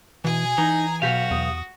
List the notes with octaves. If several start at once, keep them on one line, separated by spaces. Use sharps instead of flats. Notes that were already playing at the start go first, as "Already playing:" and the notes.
B2 E3 G#4 G#5
E3 D#4 A#5
B1 B2 F#4 G4 F5
E2 D#6